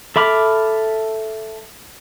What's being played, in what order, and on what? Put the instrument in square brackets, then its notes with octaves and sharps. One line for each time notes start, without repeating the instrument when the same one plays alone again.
[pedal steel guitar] A4 E5 B5 D6 F6